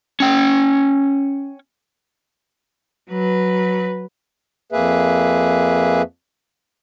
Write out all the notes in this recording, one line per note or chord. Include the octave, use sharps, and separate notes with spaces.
C#4 G5
F#3 B4
F2 A#3 G#4 B4 E5